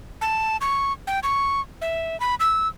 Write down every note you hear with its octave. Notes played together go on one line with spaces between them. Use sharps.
A5
C#6
G5
C#6
E5
B5
E6